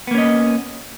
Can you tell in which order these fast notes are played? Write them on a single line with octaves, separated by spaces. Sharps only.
B3 A#3 C#4 D#5